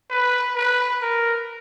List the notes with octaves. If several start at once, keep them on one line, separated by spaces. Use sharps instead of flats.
B4
B4
A#4